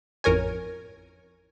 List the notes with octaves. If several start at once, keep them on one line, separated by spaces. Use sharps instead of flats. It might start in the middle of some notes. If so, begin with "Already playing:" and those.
A1 F2 A#4 C#5 G#5